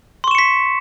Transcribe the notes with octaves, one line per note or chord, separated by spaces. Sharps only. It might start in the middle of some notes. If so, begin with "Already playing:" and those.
C6 C#6 B6 C#7 E7